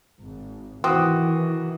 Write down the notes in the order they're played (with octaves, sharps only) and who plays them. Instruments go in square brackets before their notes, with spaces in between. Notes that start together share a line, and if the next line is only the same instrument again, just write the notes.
[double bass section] G#1
[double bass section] D#3 E3 [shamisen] C4 [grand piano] F#4 D6 D#6